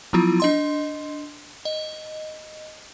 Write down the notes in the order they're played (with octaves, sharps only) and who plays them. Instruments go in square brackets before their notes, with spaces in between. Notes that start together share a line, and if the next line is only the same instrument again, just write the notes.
[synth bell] F3 F#3 B3 E4 F4
D4 D#5 C6
D#5